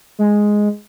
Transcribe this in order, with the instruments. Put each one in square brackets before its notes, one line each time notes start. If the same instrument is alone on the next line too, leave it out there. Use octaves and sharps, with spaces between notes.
[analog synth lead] G#3